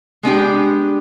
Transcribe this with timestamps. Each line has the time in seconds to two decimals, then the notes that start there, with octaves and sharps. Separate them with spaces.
0.23 G#3 B3 D4 G4